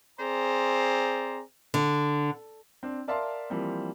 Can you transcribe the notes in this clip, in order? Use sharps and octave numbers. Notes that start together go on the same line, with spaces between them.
C4 G#4 C5 D5 A#5
D3
C4 D4
A#4 D5 E5 F5 A5 C6
E3 F3 G3 A#3 C4